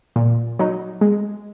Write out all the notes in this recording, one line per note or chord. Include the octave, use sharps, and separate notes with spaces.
A#2
F#3 D#4
G#3